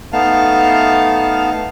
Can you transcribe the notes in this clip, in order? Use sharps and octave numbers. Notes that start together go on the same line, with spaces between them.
A3 B3 D#4 F5 A5 F6